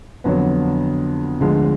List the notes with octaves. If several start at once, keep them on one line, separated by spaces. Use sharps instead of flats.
F2 D3 F#3 B3
D2 D3 F3 G#3